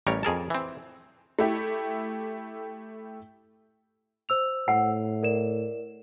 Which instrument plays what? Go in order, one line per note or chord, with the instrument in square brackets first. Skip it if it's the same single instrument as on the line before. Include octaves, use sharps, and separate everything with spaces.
[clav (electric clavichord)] A1 G3 A#4 C#5
F2 G#4 A#4 A5
E3 C4
[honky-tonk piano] A3 E4 G4
[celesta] C5 E6 F7
[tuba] A2 [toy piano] F#5
[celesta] A#4 D5 E7